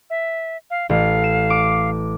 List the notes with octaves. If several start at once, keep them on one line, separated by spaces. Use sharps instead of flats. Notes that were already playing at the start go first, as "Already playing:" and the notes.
E5
F5
A1 F5
E7
D6